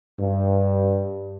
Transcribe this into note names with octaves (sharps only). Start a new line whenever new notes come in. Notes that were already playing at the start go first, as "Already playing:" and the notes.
G2